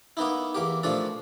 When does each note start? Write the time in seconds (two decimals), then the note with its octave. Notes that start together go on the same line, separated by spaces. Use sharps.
0.17 A#3 B3 D#4 E4
0.55 E2 A#3 G4
0.83 A#2 F3 A3 D4 A4